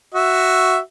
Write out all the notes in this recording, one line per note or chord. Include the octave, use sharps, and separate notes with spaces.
F#4 E5